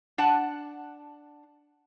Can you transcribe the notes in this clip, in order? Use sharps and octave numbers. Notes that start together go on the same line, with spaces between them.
D4 F#5 A5